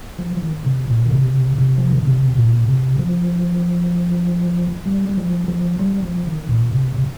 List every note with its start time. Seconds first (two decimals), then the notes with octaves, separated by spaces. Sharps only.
0.19 F3
0.37 F3
0.42 D#3
0.65 C3
0.88 A#2
1.06 D#3
1.11 C3
1.58 C3
1.78 F3
1.92 D#3
2.05 C3
2.36 A#2
2.68 C3
2.99 F3
4.86 G3
5.09 G3
5.17 F3
5.48 F3
5.79 G3
6.02 F3
6.27 D#3
6.49 A#2
6.73 C3
6.96 C3